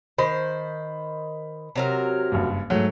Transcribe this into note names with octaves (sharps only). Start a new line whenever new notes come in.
D#3 C5 B5
C3 F#3 A#4
F#1 G2
G#2 F#3 A3